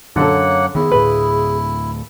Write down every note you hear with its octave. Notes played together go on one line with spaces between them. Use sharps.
F#2 D3 A#3 A4 C#5 F#5
D#3 B3 E4 G#4
D2 A2 B4